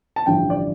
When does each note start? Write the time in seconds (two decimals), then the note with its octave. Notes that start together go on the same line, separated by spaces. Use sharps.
0.16 A5
0.26 A1 G2 D3 F3 G5
0.50 D5